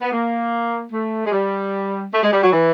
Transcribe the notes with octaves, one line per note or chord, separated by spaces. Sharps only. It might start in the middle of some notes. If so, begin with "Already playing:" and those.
B3
A#3
A3
G#3
G3
A3
G#3
G3
F#3
E3